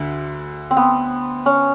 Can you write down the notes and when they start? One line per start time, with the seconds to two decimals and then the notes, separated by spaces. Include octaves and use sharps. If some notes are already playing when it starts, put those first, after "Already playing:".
Already playing: D2 D3
0.71 C4
0.77 B3
1.46 C#4